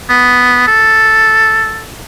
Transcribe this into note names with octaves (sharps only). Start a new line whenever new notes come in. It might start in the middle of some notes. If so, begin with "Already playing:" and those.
B3
A4